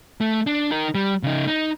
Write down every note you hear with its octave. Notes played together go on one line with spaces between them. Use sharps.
A3
D4
D#4 A#4
G3
C#3 D#4
D#4